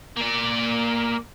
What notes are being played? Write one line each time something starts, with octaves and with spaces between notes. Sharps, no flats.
A#3 D5